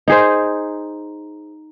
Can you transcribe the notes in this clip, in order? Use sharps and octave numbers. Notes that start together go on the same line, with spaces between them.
D#4 G#4 C5